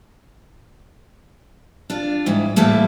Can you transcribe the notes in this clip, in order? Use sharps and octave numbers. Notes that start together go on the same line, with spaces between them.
D4 F4
G#2 E3 G3
A2 E3 G3 A3 A#3